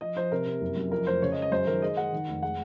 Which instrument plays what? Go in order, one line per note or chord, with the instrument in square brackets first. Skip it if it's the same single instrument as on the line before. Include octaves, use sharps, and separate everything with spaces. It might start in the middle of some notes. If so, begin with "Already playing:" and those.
[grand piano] F3 D#5
F3 C5
C3 A#4
C3
F#1
F#2
F2 A#4
F1 C5
C#3 C#5
D#5
G#3
D#5
F#2 C5
D#3 A#4
G#3 D#5
G#3 F#5
D#3
F1
G#3 F#5